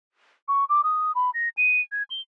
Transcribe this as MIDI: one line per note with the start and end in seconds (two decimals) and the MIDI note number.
0.48 0.65 85
0.69 0.81 86
0.84 1.12 87
1.15 1.30 83
1.34 1.49 94
1.57 1.81 99
1.92 2.03 92
2.10 2.21 103